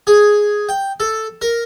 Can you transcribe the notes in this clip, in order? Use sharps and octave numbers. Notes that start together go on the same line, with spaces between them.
G#4
G5
A4
A#4